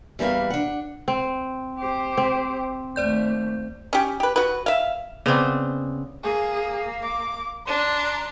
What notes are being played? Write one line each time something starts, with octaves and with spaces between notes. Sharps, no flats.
E2 G3 A#3 B4 F5
D4 F#5
C4
G4 C5
C4
D#2 A3 C5 D5 G6
C#4 G4
G4 B4
F#4 B4
E5 F5
C#3 B3 C4 D4
A#3 G#4
D6
D4 A#5 C6